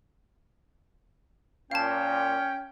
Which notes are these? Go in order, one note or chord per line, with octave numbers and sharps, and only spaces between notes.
A#2 C#4 F5 G5 A5